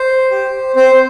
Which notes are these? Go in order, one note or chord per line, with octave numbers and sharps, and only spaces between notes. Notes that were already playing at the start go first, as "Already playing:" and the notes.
Already playing: C5
G4
C4 C5